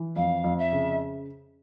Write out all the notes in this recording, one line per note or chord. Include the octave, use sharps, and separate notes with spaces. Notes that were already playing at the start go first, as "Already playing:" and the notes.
Already playing: E3
F2 F5
F2
E5
C#3